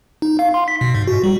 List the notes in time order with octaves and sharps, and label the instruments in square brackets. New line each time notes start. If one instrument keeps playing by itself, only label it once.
[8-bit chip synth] D#4
F5
C6
B6
B2
G#2
F#4
G3